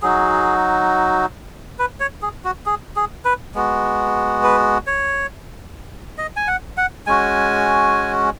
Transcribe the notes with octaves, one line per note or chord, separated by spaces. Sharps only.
F#3 D#4 F#4 G#4
B4
C#5
G#4
F#4
G#4
G#4
B4
G#3 B3 F#4
B4
C#5
D#5
G#5
F#5
F#5
G#3 C#4 F#4 G#5